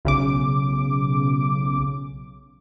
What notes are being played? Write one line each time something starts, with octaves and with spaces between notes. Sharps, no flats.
B1 C#3 D6